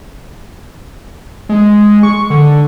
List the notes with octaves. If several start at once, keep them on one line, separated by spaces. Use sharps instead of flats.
G#3
C#6
D3